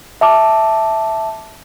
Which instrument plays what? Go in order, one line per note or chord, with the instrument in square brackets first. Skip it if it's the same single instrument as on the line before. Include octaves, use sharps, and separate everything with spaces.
[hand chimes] E5 A5 D6